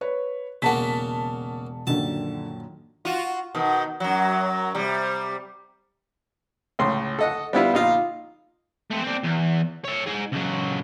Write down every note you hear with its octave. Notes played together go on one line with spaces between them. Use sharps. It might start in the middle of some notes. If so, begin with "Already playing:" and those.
B4 C#5
E1 C#3 A#3 F#5 A5 B6
A#1 F#2 D3 D#3 A5
F4 F#4
B2 D#3
F#2 F#3
C3 G3
C#2 A2 C6
A4 D#5 F#5
G3 B3 E4 F4
A#1 D#4 F4
A3 C4
C4 D4
E2
C#5 E5
D#4 G#4
C#2 F#3